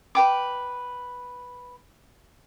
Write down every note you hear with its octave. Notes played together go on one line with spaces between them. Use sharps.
B4 G5 D6